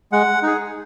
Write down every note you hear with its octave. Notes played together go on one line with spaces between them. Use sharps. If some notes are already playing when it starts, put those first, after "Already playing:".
G#3 F#5
D#4 G#4